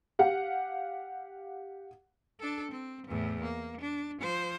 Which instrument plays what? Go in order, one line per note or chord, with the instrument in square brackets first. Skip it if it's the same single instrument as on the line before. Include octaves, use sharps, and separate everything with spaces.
[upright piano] G4 F5 F#5
[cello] D4 A4
C4
E2 A2
A#3
D4
F3 C5